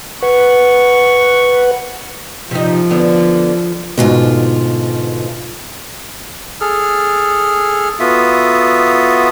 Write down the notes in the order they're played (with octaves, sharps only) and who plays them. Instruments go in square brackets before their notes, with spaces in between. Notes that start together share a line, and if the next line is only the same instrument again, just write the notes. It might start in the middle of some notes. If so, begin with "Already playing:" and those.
[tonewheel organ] B4 F#5 [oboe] C#6
[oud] C3 D#4 [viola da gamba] F3
[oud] D3 B3
[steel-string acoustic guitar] D2 G#2 F4 [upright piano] B2
[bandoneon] G#4 A4 F6
B3 F4 F#4 A4 E5 D#6